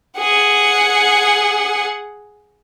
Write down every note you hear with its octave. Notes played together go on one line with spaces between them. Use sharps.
G#4 F#5